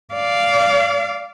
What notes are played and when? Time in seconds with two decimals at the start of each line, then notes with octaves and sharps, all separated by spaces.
0.14 D5 F5